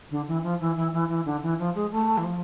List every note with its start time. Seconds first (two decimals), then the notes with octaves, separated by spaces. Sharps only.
0.10 D3
0.27 E3
0.43 F3
0.60 E3
0.76 E3
0.93 E3
1.09 E3
1.25 D3
1.42 E3
1.58 F3
1.75 G#3
1.91 A3
2.17 E3
2.23 F3